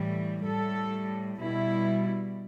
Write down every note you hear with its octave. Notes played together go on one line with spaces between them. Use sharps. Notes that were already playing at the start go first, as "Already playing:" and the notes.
Already playing: A2 E3 G3
A2 G3 A4
B2 G3 E4